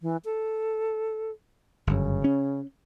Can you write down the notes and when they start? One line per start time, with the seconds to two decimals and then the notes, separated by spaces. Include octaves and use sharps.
0.01 E3
0.25 A4
1.87 G1 F#2 C#3
2.24 C#4